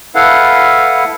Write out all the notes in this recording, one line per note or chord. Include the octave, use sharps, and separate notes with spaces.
E4 A4 B4 F5 F#5